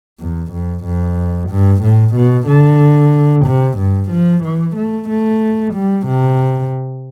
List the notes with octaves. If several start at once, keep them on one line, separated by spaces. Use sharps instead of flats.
E2
F2
F2
G2
A2
B2
D3
C3
G2
F3
E3
A3
A3
G3
C3